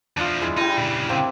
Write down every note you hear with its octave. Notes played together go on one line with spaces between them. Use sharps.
E2 F3 D4 F4
G#3 E4
G3 D#4 E4
A#2 C#3
A#3 C4